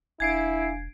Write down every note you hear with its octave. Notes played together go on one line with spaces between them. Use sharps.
E1 D4 E4 F5 G#5 G#6 C7 D7